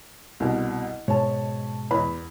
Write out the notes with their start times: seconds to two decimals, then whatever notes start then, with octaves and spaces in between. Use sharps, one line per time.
0.40 C2 B2
1.08 G#2 B2 G#3 C#5 A5
1.91 E2 B4 B5